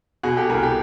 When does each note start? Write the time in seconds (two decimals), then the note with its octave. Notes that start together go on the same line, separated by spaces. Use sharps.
0.23 B2 F#4 G#4
0.37 G4 A4
0.49 C2 G#4 A#4
0.63 G4 A4